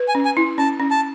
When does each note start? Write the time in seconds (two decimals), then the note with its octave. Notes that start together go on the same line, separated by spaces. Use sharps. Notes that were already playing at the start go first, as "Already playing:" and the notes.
Already playing: B4
0.08 G#5
0.15 C#4
0.25 G#5
0.37 E4
0.58 C#4 A5
0.80 C#4
0.91 A5